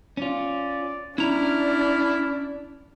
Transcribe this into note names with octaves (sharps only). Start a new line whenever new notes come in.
C#4 F4 D5
C#4 D4 E4 A#5 F6